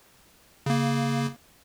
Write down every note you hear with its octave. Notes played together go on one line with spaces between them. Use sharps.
C#3 A#3